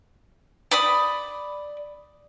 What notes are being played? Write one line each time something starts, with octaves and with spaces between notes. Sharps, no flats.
D5 B5 D#6